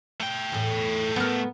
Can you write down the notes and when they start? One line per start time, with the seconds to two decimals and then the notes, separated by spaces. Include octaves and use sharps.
0.20 A3 G5
0.52 E2 A2
1.16 B3 A#4